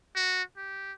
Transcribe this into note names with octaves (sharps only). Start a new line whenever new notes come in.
F#4
G4